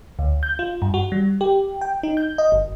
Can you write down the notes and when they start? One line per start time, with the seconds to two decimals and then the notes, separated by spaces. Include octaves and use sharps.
0.19 D2
0.43 G6
0.59 F4
0.82 G2
0.94 F#4
1.12 G3
1.41 G4
1.81 G5
2.03 D#4
2.17 G6
2.38 D#5
2.52 G1